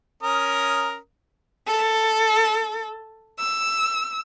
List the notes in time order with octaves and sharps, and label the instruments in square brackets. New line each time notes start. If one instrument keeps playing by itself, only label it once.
[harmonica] C#4 A#4 D#6
[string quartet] A4
E6